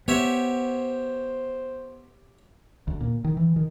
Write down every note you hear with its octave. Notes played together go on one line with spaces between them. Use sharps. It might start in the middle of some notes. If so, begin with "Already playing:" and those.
B3 G4 C5 C#5 E5
D2
A#2
D#3
E3
D#3